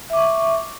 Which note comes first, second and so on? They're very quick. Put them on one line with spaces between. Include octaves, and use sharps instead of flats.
E5 D6 C#6